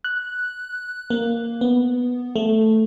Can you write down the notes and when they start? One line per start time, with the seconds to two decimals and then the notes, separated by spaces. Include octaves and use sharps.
0.04 F#6
1.10 A#3
1.61 B3
2.36 A3